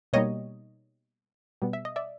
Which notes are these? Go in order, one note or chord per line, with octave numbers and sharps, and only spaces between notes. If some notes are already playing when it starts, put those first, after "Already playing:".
B2 G3 A#3 D#4 C#5 D#5
B2 G3 B3
E5
D#5
D5 E5